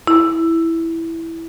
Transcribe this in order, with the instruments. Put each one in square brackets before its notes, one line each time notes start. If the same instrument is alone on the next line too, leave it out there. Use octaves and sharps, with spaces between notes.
[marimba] E4